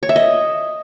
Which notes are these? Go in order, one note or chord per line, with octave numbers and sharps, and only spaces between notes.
C#5
E5
D#5